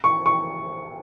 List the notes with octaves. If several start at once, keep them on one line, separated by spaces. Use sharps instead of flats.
C#6
C#6